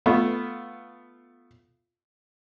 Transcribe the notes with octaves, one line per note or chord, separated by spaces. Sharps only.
A3 B3 F4